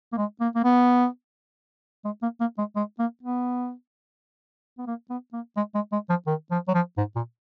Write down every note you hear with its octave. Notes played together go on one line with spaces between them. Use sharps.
A#3
G#3
A#3
A#3
B3
G#3
A#3
A#3
G#3
G#3
A#3
B3
B3
A#3
B3
A#3
G#3
G#3
G#3
F3
D#3
F3
F#3
F3
G#2
A#2